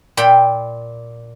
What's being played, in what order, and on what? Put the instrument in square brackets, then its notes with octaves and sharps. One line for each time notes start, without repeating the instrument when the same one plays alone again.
[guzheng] A#2 G5 B5